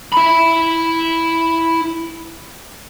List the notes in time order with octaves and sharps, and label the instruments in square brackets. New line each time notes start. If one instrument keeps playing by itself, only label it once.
[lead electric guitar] E4 B5